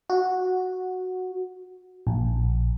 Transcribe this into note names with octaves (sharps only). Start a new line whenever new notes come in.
F#4
A#1